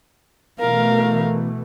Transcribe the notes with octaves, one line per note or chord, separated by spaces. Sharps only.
B2 E3 A3 A#4 F5